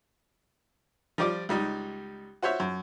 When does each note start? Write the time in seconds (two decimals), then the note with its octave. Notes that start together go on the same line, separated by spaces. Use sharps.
1.18 F3 G3 D5 D6
1.49 C#2 G3 D#4
2.42 F#4 C5 C#5 E5
2.60 F#2